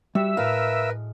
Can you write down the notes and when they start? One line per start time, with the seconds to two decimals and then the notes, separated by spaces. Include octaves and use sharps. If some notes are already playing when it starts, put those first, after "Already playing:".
0.15 G3 F#4 E5
0.37 A2 G#3 A#4 B4 F5 F6